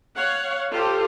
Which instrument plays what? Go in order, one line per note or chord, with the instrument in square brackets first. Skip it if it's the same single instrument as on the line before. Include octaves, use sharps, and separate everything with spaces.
[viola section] C#5 F5 F#5
F4 G4 A4 C5